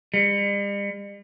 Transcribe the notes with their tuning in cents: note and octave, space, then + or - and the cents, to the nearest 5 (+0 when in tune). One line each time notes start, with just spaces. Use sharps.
G3 +45